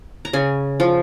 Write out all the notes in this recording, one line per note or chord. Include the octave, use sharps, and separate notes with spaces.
A#5
C#3 G#5
F3